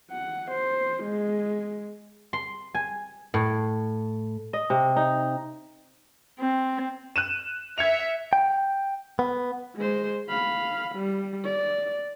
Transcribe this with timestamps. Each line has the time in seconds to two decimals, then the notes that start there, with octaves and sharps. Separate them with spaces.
0.11 F#5
0.51 C5
1.03 G#3
2.33 C6
2.75 G#5
3.34 A2
4.53 D#5
4.70 C3
4.96 D#4
6.40 C4
7.16 F#6 D#7 E7
7.78 E5 G#6 C#7 F7
8.33 G5
9.19 B3
9.76 G#3 C5
10.29 F5 B5
10.95 G3
11.44 D5